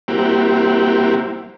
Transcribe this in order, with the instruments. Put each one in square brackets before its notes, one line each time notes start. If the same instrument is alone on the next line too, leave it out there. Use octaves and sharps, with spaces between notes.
[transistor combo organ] G3 A#3 C4 E4 F#4 G4